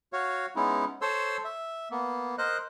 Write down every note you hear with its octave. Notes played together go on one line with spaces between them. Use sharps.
F#4 C#5 F5
G#3 B3 C#4 D#4 E4
A4 C5 C#5 C6 E6
E5
A#3 B3
A#4 C5 D#5 F#6